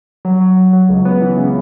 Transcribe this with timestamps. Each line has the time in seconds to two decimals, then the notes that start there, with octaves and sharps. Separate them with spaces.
0.25 F#3
0.41 F#3
0.57 F#3
0.73 F#3
0.89 C#2
1.05 B3
1.22 E3
1.38 C#3